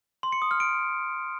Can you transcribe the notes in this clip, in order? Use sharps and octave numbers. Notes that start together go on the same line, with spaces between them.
C6
C#7
D#6
F6
D7